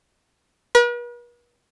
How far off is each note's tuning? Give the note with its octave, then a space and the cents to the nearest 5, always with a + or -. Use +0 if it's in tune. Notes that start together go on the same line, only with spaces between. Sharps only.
B4 -45